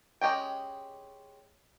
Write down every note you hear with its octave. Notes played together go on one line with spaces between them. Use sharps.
G#3 C#4 G4 D#5 G5